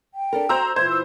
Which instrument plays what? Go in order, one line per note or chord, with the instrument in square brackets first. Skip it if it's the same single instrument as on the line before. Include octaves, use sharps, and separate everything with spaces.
[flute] G5
[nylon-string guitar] D4 A4 A#4
[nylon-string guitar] F#4 [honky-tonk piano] C5 A#5 E6
[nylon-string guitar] A#2 E3 E4 [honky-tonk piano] C5 [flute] G#6
[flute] E6